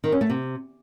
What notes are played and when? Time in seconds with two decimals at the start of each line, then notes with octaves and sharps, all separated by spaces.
0.04 D#3
0.12 C#4
0.21 A3
0.30 C3